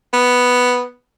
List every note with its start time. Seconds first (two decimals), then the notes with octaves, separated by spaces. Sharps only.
0.13 B3